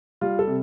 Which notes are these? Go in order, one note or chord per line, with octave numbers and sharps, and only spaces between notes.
G3 F4
A4
C3